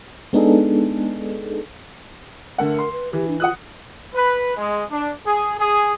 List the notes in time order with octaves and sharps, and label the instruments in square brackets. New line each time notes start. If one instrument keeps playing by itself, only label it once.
[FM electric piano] G#3 B3 D4 D#4 G#4 A4
[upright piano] D3 A3 F#5 [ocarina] A#4
[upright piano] C6
[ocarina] B4
[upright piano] E3 [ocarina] G4
[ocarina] D4
[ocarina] F4 [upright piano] F#5 D#6 F#6
[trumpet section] B4
G#3
D4
G#4
G#4